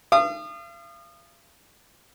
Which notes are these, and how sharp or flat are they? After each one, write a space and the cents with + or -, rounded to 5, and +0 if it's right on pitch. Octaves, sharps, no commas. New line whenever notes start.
F5 -40 D#6 -35